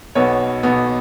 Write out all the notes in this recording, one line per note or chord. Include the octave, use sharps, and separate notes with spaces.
B1 B2 B3 C#5
B1 B2 B3